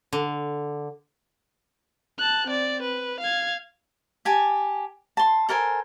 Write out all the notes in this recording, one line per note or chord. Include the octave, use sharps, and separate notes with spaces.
D3
A5 F#6
C4 D5
B4
F5 G#6
G4 G#5 A5
A5 C6
A4 A#4 C5 G#5